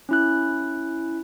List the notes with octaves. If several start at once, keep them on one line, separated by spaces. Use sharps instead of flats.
C#4 E4 F#6